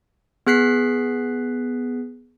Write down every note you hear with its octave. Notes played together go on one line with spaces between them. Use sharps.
B3 G#4 F#6 B6 C7